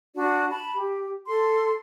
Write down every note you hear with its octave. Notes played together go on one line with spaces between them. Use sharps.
D4 F#4 D5
A5 B5
G4
A4 C6